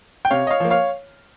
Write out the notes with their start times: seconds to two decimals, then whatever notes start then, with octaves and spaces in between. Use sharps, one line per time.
0.25 G5
0.31 C3 C#5 F5
0.47 D#5
0.50 C#5 F5
0.60 F3 A#3
0.70 C#5 F5